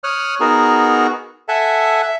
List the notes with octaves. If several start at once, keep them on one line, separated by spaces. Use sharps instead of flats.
C#5 D#6 F6 F#6
B3 D#4 F#4 G#4 A#4
A4 E5 F#5 G#5 A5
E5